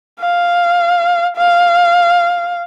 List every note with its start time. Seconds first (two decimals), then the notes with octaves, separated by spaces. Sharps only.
0.20 F5
1.37 F5